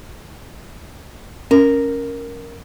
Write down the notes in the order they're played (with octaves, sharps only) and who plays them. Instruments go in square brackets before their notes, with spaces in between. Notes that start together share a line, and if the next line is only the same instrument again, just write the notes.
[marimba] C#4 [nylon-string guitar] A#4